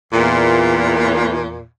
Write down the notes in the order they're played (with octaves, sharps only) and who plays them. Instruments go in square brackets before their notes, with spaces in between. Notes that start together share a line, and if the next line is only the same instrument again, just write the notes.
[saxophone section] E2 A#2